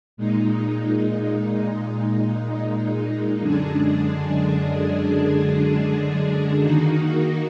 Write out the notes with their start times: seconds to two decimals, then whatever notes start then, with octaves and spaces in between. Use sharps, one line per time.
0.17 A#2 G#3 D#4
3.39 F#2 D3 G#3 D4 G#4
6.62 D#3 A#3 D#4 F#4